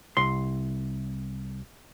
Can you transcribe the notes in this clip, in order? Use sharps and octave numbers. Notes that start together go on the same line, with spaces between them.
C2 C6